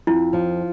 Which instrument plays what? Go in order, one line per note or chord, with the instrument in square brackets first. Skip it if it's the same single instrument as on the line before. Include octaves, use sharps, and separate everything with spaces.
[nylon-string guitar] F2 [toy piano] E4
[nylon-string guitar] F3